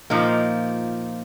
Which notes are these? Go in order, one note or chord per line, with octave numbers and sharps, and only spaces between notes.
A#2 F3 A#3 D#4